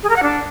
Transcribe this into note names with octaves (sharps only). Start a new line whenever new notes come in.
G#4
A#4
F#5
D4